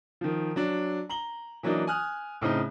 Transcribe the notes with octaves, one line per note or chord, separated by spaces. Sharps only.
D#3 F3
F#3 D4
A#5 F#7 G7
E3 F#3 A#3 D4 D#4
G#5 D#6 F6 F#6
A2 C#3 C4 D#4